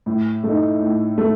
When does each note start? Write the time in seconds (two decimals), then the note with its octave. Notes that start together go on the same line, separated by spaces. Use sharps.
0.06 A2
0.44 A3 D#4
0.81 A2
1.18 A3